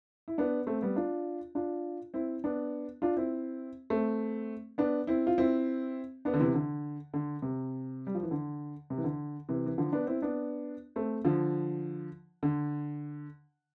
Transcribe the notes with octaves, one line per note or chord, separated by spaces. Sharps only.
E4
B3 D4
A3 C4
G3 B3
D4 F4
D4 F4
C4 E4
B3 D4
D4 F4
C4 E4
A3 C4
B3 D4
C4 E4
F4
C4 E4
B3 D4
D3
C3 E3
D3
D3
C3
G3
F3
E3
D3
C3
E3
D3
C3 E3
E3
D3 F3
B3 D4
C4 E4
B3 D4
A3 C4
D3 F3
D3